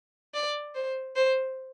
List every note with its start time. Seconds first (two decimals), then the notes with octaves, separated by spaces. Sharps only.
0.34 D5
0.75 C5
1.16 C5